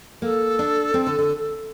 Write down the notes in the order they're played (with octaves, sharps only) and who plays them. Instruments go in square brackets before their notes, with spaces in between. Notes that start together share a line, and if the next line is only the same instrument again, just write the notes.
[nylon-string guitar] A#3 [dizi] A4
[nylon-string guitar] D4
C4
D3
D3